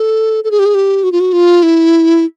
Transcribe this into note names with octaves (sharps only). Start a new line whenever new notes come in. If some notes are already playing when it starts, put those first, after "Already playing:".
Already playing: A4
A4
G#4
G4
G#4
G4
F#4
F4
F#4
F4
E4